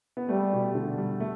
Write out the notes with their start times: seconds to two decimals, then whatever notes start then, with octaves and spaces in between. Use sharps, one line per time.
0.17 B3
0.29 G3 A3
0.53 B2
0.75 D3
0.98 G3
1.20 A3